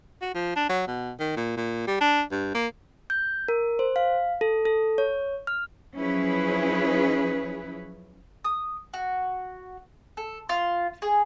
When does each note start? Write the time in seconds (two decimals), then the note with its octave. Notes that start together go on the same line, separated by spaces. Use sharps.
0.22 F#4
0.34 F3
0.56 D4
0.69 F#3
0.87 B2
1.19 D#3
1.36 A#2
1.57 A#2
1.87 G3
2.01 D4
2.31 G2
2.54 A#3
3.10 G6
3.48 A#4
3.79 C5
3.96 F5
4.41 A4
4.65 A4
4.98 C#5
5.47 F6
5.95 F3 F#3 C#4 E4 G#4 B4
8.44 D#6
8.94 F#4
10.17 A4
10.49 F4
11.02 G#4